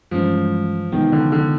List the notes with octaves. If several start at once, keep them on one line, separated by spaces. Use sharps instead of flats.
G2 E3 F3 G#3 C#4
C3 D#3 E3 G#3 B3
D3
D3